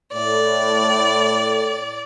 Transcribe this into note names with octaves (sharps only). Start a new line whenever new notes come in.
A2 D5